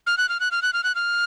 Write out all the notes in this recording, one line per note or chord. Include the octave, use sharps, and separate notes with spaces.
F6
F#6
F6
F#6
F6
F#6
F6
F#6
F6